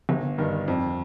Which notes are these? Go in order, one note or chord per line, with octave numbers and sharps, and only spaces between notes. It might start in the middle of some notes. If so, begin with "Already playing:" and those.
G1
G2 D#3
F2